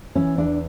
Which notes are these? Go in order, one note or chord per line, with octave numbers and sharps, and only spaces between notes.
E3 C#4
E2 D4